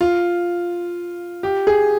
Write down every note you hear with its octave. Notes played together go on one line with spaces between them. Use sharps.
F4
G4
G#4